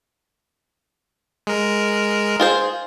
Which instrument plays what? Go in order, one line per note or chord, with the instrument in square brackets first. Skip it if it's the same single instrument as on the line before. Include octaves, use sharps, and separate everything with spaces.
[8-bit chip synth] G#3 A#4
[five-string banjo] F4 G#4 C5